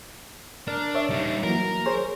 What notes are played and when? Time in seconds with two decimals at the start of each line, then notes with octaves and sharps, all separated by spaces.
0.67 D4 A#4 F6
0.95 C#5 E5
1.10 G3 D#4
1.44 E3 F#3 A#3 A#4
1.86 G#4 C5 C#5